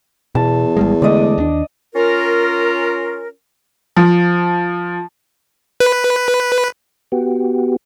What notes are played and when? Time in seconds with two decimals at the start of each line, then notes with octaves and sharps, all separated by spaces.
0.35 E2 B2 A5
0.77 G#1 G3 G#3
1.02 D3 G#3 A3 D5 D#5
1.38 D#2 D4
1.95 C#4 F4 A#4
3.96 F3
5.80 B4
7.12 B3 F#4 G4